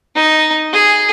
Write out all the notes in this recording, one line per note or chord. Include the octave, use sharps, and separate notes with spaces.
D#4
G#4